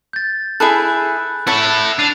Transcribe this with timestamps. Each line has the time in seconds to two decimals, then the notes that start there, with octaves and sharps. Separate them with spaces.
0.13 G6 A6
0.60 E4 G#4 A4 B5 F#6
1.47 E4 A4 C#5 F#5 A5 C#7
1.99 D4 C7 D#7 F7